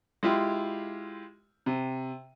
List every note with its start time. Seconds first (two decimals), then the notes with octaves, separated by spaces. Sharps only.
0.23 G#3 E4 F4 G4
1.66 C3